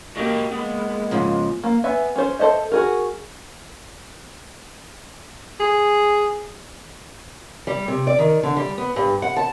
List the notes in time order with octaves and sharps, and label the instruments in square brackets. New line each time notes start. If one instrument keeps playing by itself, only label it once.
[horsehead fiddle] A#3 G4 [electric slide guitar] F#4 D#5 G5
[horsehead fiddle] G#3 A#3 [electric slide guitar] B3
[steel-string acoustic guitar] G#2 C#3 F3
[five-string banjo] A#3
B3 E5 G#5
C#4 C5
A4 C5 D#5 E5
F#4 G#4 A#4
[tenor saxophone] G#4
[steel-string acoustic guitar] G3
C3
D5
D#3
D3
G3
B3
G2
F#5
A5